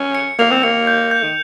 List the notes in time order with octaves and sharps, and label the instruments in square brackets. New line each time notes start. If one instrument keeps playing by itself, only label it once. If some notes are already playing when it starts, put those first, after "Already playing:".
Already playing: [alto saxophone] C#4
[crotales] C#7
[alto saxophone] A#3 [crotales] F7
[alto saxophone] C4
[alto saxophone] A#3 [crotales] C#7
[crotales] G6
G6
[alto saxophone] D#3